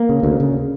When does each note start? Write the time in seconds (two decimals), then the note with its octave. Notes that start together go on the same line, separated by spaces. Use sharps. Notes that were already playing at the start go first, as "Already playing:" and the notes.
Already playing: A#3
0.09 C#3
0.23 D2
0.40 C#3